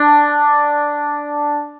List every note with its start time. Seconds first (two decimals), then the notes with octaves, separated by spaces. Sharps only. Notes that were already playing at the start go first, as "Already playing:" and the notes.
Already playing: D4